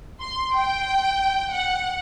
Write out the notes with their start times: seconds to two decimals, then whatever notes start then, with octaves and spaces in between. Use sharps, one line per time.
0.21 C6
0.53 G5
1.52 F#5